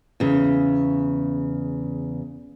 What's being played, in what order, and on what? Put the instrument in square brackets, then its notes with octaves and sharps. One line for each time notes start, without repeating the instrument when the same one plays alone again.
[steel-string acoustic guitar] E2 C#3